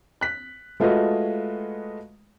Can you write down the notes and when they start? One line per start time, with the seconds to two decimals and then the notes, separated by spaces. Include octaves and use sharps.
0.21 F#6 B6
0.80 G#3 A3 F4 F#4 B4 D#5